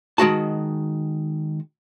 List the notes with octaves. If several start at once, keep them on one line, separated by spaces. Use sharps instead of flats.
D#3 G#3 F#4 A5